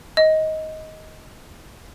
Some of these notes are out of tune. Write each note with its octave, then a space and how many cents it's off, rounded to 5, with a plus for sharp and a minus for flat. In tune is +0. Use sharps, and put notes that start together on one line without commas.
D#5 +15